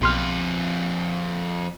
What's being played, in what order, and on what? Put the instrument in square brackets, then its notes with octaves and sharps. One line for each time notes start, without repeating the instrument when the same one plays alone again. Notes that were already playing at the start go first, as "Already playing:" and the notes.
[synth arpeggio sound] B1 C6 F6 [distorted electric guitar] F2 B4